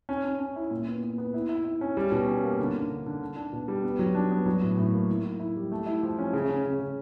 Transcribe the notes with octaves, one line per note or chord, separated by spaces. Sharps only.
C#4
C#4
C#4
E4
A#2
B3
B3
B3
E4
E4
E4
C#4
G3
B2
C#4
A#3
D3
D3
D3
D3
D4
D4
B2
G3
B3
F#3
D4
B3
F#3
A2
A2
A#3
E4
E4
E4
G3
A3
E4
F3
C#4
C#3
C#4
C#3
C#3